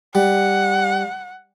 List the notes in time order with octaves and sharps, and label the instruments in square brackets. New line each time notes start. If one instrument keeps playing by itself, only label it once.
[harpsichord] G3 [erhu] F#5